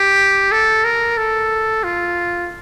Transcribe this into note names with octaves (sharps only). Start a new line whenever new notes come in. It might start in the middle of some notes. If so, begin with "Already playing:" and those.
Already playing: G4
A4
A#4
A4
F4